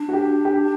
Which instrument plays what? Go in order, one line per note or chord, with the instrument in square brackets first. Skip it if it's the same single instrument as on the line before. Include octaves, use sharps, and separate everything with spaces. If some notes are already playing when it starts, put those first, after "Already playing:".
Already playing: [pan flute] D4
[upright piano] F#4
G4
G4